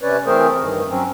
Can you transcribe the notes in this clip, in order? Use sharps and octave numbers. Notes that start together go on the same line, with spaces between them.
C3 C#4 B4 C#5 D5
E3 A3 C4 G#4 A#4 C5
G2 D#3
F#3 C4 C#4